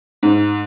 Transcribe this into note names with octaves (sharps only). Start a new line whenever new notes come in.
G#2